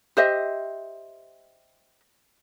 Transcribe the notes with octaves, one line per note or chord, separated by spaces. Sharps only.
G4 C5 D#5 E5